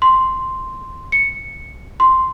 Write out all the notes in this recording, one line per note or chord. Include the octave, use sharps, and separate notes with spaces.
C6
C#7
C6